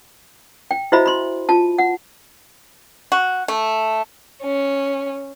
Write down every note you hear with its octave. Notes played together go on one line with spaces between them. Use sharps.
G5
E4 F#4 C5 D#5 E5 B5
B5 C6
F4 A5
F#5
F#4
A3
C#4